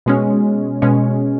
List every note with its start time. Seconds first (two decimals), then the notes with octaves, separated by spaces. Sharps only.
0.06 B2 G#3 C#4
0.82 B2 G#3 C#4